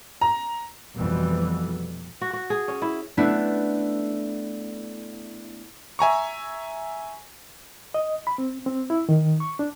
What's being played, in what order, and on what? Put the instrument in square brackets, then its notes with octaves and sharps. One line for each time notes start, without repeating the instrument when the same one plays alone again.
[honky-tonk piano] A#5
[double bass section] F1 F2 B2 E3 G3
[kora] F#4
F#4
G#4
C#4
E4
[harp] A3 B3 D4 E4
[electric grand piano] E5 G#5 A#5 C#6
[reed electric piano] D#5
B5
C4
C4
E4
D#3
C#6
D4